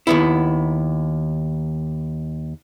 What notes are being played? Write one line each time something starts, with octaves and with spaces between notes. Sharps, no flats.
D#2 B3 E4